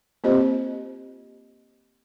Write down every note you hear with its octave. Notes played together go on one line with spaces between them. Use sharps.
A#3 C4 F4 G4 C5 D#5